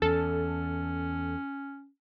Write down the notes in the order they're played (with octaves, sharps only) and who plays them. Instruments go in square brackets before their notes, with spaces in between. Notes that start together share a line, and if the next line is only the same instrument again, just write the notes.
[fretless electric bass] E2 [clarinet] C#4 [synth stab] A4